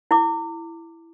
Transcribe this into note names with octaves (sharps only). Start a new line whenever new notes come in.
E4 D6